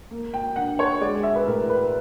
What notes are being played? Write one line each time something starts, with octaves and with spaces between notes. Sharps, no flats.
A#3
G5
D3 F#5
C#5
G#3 D5
E5
B4
A2 A#4
B4